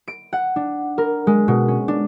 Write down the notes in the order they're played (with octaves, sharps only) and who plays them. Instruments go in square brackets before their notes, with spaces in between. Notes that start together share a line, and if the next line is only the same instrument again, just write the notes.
[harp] D7
F#5
D4
A#4
G#3
B2
C#4
D4